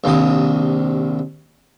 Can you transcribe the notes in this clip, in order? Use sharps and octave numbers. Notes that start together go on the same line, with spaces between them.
A#1 D#2 C3 D#3 D#6